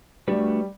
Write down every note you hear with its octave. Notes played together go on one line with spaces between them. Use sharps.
G3 A3 D4 F#4 B4